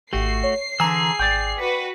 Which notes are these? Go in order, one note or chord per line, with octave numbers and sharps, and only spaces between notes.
G#1 A3 F#4 G4 C7
C#5
D3 E3 G#4 G#5 A#5 E6
G#1 D5 G5
F#4 B4 B6